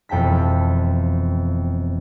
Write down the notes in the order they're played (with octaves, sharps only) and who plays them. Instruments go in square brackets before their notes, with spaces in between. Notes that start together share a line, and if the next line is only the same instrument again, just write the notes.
[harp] E1 F2 G5 A5 B6